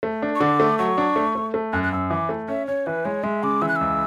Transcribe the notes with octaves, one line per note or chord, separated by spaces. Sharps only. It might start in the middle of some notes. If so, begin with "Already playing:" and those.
A3
D4
C#6
D3 D6
A3
F#3 C#6
D4
A3
A3
A3
F#2 F#6
F#6
F#2 E6
E3 D6
A3
C#4 E5
C#4 C#5
E3 B4
G#3 C#5
G#3 E5
C#3 D6
E3 E6
F#6
C#2 E6